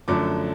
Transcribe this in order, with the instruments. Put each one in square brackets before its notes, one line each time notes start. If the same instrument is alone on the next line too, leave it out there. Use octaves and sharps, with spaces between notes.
[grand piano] F#2 D3 F3 A3 D6